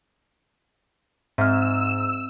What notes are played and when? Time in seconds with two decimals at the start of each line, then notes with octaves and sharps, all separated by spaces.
1.38 G#2 C4 E5 E6 F6